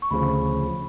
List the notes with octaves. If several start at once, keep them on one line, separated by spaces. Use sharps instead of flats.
C#6
D2 C#3 F3 B5